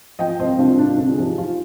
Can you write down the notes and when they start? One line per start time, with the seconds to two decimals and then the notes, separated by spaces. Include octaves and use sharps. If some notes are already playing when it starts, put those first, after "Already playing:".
0.19 F3 D#5 G5
0.39 C2 C5 D#5
0.58 C2 D4 F4
0.78 C2 D4 F4
0.98 D3 D4 F4
1.12 G#4
1.18 F3 D#4 G4
1.31 G4
1.38 F3 F4 G#4